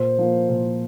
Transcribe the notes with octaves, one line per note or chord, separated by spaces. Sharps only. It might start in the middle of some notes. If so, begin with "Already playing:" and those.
Already playing: A#2 C5
F3 A#3
A#2